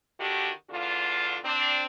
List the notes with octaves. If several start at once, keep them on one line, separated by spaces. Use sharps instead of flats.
D3 D#3 F#4 G4
E2 D3 F4
C4 D4